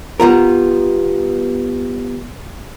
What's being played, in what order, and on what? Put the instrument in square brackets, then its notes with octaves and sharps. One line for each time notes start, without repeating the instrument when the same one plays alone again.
[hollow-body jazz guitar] G3 B3 F4 A#4